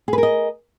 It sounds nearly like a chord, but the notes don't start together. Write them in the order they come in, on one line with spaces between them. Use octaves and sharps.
G#4 B4 A#4 D#5